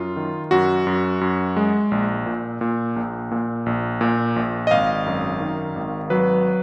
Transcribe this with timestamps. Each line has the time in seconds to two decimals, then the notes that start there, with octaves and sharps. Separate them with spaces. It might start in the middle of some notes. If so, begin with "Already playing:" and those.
Already playing: F#2 F4
0.16 D#3
0.51 F#2 F#4
0.87 F#2
1.21 F#2
1.56 G#3
1.91 A#1
2.26 A#2
2.61 A#2
2.96 A#1
3.31 A#2
3.66 A#1
4.01 A#2
4.36 A#1
4.67 D#5
4.71 G#1 F5
5.06 F#2
5.40 D#3
5.76 G#1
6.10 F#3 B4